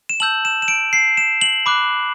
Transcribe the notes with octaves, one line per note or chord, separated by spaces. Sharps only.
E7
A5 E6 G6 F#7
E7
E7
D7
C7
E7
F#7
B5 D6 F#6